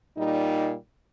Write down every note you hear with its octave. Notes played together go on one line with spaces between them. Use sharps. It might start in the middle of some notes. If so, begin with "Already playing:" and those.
A#2 G3 D#4